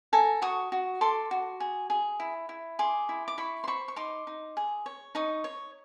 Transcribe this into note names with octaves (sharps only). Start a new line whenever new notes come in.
A4 G#5 A#5
F#4 C#6 D#6
F#4
A4 C6 D6
F#4
G#4
G#4
E4
E4
G#4 C6 D6
E4
D6
E4 B5 C#6
C6
C5 B5 C#6
C#6
D#4 C6 D6
D#4
G#4
C#5
D#4 C#6 D#6
C#5